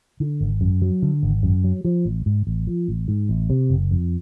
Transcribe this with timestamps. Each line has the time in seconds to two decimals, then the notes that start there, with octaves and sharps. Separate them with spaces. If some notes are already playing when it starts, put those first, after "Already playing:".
0.20 D3
0.41 G#1
0.61 F#2
0.82 F#3
1.02 D3
1.23 G#1
1.43 F#2
1.64 F#3
1.84 F3
2.05 A1
2.26 G#2
2.47 A1
2.67 F3
2.88 A1
3.08 G#2
3.29 A1
3.50 C3
3.70 F#1
3.91 F2